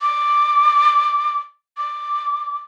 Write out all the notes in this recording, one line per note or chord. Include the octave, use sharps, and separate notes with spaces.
D6
D6